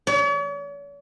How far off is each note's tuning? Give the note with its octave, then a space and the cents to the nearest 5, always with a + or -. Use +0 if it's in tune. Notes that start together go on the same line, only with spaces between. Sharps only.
C#5 +45